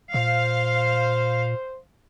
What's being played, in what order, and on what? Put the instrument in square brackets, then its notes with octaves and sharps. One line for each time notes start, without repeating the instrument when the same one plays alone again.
[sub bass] A#2 [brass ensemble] C5 [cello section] F5